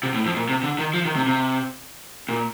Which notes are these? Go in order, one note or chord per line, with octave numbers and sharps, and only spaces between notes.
C3
A2
F2
A#2
C3
D3
D#3
F3
D#3
C3
C3
A#2